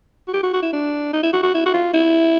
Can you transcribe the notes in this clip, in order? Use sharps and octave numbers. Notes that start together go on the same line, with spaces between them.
F#4
G4
F#4
F#4
E4
D4
D#4
E4
F#4
F#4
E4
F#4
F4
E4